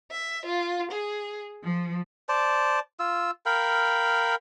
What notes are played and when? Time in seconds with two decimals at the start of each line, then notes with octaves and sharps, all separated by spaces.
0.10 E5
0.46 F4
0.92 G#4
1.63 F3
2.29 C5 D5 A5
3.00 F4 E6
3.46 A#4 F5 G5 B5